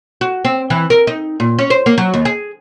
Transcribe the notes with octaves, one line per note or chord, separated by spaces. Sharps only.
F#4
C4
E3
A#4
D#4
A#2
C#4
C5
A#3
F#3
D#2
G#4